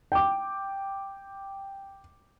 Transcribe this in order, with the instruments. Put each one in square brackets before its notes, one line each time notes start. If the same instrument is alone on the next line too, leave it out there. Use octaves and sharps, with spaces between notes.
[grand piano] G5 D6